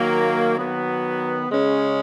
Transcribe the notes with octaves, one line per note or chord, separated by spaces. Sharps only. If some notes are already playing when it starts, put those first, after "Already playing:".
Already playing: D#3 F#3 A#3
D#3 F#3 B3
C#3 G#3 C#4